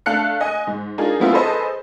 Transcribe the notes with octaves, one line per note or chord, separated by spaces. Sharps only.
A3 D4 F5 A5 F#6 C#7
D#5 G#5
G#2
D4 D#4 F4 G#4 A#4
F#3 A3 B3 C4 E4 F4
G#4 A4 B4 C5 D#5 A5